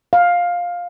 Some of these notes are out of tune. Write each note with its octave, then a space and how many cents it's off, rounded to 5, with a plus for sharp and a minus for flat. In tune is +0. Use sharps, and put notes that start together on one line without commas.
F5 +10